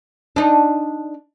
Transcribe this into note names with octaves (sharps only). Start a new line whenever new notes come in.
D4 D#4